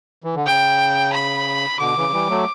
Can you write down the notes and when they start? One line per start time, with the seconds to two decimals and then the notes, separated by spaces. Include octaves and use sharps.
0.24 E3
0.35 D3
0.46 C#3 G5
1.12 B5
1.79 B2 D3 D6
1.96 C#3 E3
2.13 E3 G3
2.30 F#3 A3